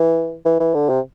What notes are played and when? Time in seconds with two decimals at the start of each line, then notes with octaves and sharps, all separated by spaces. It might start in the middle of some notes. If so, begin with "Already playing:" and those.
Already playing: E3
0.45 E3
0.60 E3
0.74 D3
0.89 C3